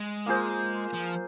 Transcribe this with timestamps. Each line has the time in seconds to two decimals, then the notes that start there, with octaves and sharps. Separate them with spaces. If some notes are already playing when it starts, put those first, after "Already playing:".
Already playing: G#3
0.26 A#3 F4 G#4 C5
0.94 F3